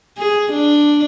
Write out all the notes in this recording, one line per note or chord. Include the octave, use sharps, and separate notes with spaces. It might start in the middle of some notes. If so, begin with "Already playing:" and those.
G#4
D4